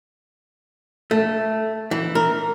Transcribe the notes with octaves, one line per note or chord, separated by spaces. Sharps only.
A3
E3
A#4